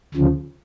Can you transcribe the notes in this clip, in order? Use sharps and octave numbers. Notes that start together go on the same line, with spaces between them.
D2 C#3 F3